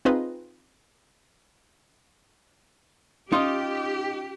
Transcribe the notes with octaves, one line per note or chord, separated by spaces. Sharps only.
C4 D#4 F4 G#4 B4 D#5
C#4 D#4 F4 G4 D#5